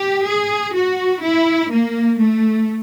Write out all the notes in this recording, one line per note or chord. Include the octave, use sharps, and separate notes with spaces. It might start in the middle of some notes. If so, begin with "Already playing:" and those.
Already playing: G4
G#4
F#4
E4
A#3
A3